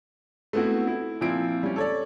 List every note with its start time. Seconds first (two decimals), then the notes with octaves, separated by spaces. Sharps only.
0.53 A3 B3 C4 E4 F#4
0.87 E4
1.21 A#2 F3 C4 E4 D7
1.63 G3 C#4
1.76 A4 C#5 D5